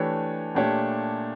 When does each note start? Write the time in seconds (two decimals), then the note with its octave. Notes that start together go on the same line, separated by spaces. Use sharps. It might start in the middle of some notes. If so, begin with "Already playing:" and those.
Already playing: E3 A3 D4 G4 C#5
0.55 A#2 A3 D4 G4 C#5